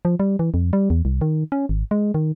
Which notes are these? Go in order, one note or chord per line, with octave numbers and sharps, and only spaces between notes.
F3
G3
E3
F2
G3
E2
C2
D#3
C#4
G#1
G#3
D#3